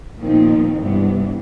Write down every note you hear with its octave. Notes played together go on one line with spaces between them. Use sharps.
A#2 D#3 F3 B3 C4 D#4
G2 C3 E3 G#3 B3 D4